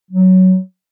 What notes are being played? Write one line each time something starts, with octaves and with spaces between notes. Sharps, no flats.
F#3